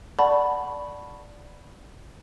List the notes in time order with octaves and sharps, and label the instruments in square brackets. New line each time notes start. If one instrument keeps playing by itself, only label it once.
[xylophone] D5 F#5 A5 B5 C#6